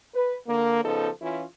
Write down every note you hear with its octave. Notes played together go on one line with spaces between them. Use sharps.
B4
D3 A#3
C#3 F3 B3 D#4 A4
E3 C#4 E4 F4